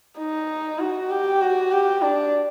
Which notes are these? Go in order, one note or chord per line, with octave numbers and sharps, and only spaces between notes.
D#4
F#4
G4
F#4
G4
D4